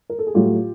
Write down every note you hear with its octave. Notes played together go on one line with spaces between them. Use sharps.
A#4
A4
G#4
A2 F#3 A3 F4 G4